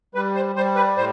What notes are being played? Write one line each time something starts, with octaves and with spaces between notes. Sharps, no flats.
G3 B4
C5
G3 C5
B4
A2 C5